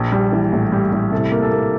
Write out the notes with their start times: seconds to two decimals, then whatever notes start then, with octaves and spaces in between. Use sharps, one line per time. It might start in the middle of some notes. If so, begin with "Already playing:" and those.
Already playing: A#1
0.12 G3
0.33 E3
0.53 A2
0.72 G3
0.92 A2
1.12 C3 A4
1.32 A#3
1.42 A4
1.52 A#3